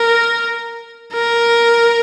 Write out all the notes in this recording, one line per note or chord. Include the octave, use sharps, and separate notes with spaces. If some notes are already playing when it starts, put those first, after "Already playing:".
Already playing: A#4
A#4